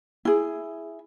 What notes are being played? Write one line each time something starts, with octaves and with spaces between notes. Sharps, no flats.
E4 G#4